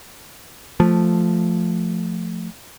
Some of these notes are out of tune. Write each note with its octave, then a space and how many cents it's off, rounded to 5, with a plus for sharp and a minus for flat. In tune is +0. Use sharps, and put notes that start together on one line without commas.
F3 +0 A3 +0